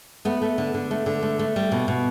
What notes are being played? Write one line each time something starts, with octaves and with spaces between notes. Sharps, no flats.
A3 B3
A3
D3
D3
A3
D3
A3
A3
G3
B2
B2